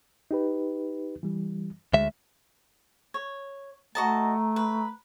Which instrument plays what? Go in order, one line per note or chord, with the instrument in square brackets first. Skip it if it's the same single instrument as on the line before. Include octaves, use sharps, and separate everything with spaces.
[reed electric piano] D#4 G4 B4
E3 G3
[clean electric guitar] D2 E5 [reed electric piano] G#3
[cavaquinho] C#5
[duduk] A3 [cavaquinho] F#4 D#5 A5 [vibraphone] A#5
[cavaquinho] B4